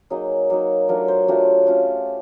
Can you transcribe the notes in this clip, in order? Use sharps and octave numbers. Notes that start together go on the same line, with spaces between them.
F#3 A#3 D#4 G#4
F#3 A#3 D#4
F#3 A3 D4 F4 A#4
C5
F#3 A3 D4 F4 G4
A3 C#4 F4